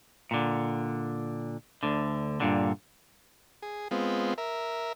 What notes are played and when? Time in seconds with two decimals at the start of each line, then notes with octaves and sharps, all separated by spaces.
0.31 A#2 D3
1.83 D2 D3
2.40 G2 A#2 D3
3.63 G#4
3.91 G#3 B3 C4 F4
4.38 A#4 E5